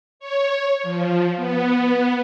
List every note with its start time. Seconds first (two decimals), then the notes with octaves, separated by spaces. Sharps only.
0.20 C#5
0.83 F3
1.36 B3